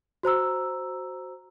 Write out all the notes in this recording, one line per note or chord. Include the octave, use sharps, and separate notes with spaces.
F#4 C5 A#5 E6